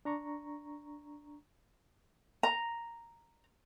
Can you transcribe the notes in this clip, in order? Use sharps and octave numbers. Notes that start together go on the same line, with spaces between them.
D4 A#5 C#6
A#5